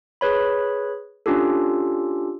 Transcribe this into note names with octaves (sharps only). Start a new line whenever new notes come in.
G#4 B4 C#5 B5
C#4 D4 F4 G4 A4